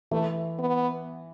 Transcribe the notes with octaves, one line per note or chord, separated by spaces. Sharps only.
E3 A3
B3